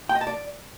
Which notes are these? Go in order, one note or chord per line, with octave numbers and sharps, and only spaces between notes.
G5
D#5
A5
D5